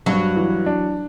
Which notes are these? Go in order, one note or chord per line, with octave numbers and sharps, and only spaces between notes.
G2 F#3
E3
D4